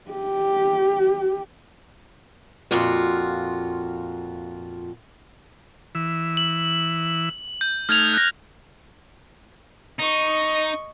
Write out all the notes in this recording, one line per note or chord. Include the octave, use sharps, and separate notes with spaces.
G4
F2 A#2 F4 F#4
E3 E6
F#7
G6
A3 D#4 F6 G#6 F7
F#6 A#6
D#4 D#5 C#6